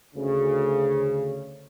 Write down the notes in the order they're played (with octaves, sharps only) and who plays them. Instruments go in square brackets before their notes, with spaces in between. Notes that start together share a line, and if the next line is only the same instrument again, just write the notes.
[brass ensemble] D2 C#3